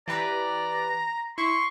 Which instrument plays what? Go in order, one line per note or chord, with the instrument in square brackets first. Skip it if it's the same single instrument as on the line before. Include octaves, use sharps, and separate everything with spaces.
[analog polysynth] E3 G4 B4 [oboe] D5 [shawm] A#5
[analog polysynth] E4 [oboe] C6 [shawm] C#6